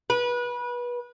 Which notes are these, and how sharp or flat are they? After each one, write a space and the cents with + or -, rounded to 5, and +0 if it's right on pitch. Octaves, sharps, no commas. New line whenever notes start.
B4 -25